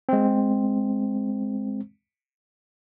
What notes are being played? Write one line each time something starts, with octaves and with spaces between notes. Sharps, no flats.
G#3 C4